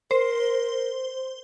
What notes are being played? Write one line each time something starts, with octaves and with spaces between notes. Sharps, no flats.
A#4 C5